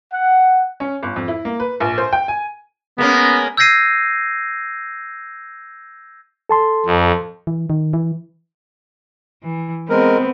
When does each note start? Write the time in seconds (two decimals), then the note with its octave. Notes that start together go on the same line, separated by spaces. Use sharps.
0.13 F#5
0.80 C#4
1.03 G1
1.16 F2
1.28 E4
1.45 A#3
1.60 B4
1.80 A#1
1.98 C5
2.13 G5
2.28 G#5
2.98 G#3 A#3 B3 C#4
3.57 E6 G6 G#6 A#6 C7 D#7
6.49 A4 A5 C6
6.86 F2
7.47 E3
7.70 D#3
7.93 E3
9.44 E3
9.90 G#3 B3 C4 A#4